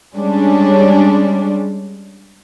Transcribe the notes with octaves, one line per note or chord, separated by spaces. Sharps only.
G3 G#3 C#4 D4